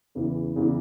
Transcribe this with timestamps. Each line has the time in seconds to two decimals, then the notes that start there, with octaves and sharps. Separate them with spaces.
0.15 E2 C#3 E3
0.56 E2 C#3 E3